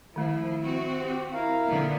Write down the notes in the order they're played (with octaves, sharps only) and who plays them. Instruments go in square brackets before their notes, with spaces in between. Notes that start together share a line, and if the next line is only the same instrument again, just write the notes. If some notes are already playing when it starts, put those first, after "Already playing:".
[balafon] D#3 A3 [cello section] F3 [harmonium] E4
[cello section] C4 F#4
[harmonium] G4
E4 A#4 F5
[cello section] A#2 D3 B3